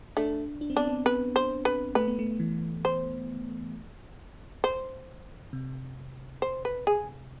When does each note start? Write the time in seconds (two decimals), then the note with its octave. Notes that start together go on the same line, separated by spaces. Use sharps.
0.17 A3 D4
0.61 D4
0.70 C4
0.77 B3 D4
0.87 C4
1.06 B3 B4
1.36 C5
1.65 B4
1.95 A3 B4
2.08 B3
2.19 A3
2.40 E3
2.85 C5
4.64 C5
5.53 C3
6.42 C5
6.65 B4
6.87 G#4